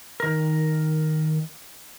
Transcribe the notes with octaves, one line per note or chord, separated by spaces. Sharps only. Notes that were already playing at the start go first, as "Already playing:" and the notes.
D#3 A#4